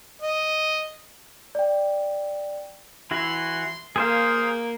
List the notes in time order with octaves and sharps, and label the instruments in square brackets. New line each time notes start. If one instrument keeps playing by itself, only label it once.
[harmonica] D#5
[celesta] D5 G5
[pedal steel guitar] E3 E4 F#4 [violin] C6
[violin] A#3 [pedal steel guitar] G#4 C5 F5